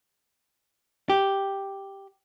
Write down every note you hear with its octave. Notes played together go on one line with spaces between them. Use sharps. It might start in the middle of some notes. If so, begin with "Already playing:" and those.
G4